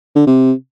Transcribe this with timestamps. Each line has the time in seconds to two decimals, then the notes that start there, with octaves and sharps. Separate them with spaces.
0.16 D3
0.27 C3